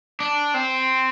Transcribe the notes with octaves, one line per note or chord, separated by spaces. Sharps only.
D4
C4